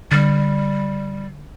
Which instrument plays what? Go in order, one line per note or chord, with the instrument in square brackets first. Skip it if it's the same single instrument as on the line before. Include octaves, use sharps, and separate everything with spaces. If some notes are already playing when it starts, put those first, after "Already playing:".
[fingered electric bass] D3 [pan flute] G3